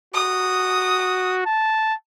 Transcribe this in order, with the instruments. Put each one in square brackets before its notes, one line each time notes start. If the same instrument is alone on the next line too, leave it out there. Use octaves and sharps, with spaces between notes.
[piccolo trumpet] F#4 [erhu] D#6
[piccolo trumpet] A5